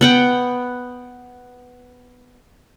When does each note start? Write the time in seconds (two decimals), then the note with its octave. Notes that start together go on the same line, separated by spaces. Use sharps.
0.01 B3 F#5 G5